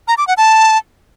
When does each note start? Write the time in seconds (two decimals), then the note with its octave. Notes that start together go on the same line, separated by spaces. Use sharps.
0.08 A#5
0.18 D6
0.28 F#5
0.37 A5